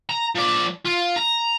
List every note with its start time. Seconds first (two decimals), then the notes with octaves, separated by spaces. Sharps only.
0.09 A#5
0.35 F3 D5
0.85 F4
1.16 A#5